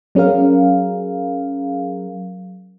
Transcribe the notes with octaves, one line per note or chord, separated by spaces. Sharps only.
F#3 C#4 G#4 A#4 F5